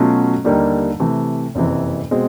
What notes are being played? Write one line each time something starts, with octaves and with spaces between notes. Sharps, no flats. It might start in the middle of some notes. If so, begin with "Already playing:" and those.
Already playing: B2 F#3 A3 C#4 F4
D#2 D3 G3 A#3 D#4
C3 E3 A3
F#1 F2 C3 E3
B2 G#3 C4